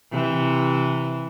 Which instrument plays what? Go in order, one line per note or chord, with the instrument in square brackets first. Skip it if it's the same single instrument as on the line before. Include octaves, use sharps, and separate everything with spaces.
[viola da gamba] C3 E3